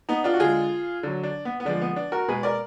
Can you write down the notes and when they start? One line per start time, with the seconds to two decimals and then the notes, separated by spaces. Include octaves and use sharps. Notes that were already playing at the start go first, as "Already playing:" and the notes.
0.09 B3 D#4
0.24 D4 F4
0.34 F#4
0.40 D3 G#3 F4 G#4
1.03 D3 F#3
1.23 D4
1.45 B3
1.60 B3
1.65 D3 F3 G#3 D4
1.82 B3
1.96 D4
2.12 F#4 A#4
2.28 B2 G#3 G#4 B4
2.43 A#4 D5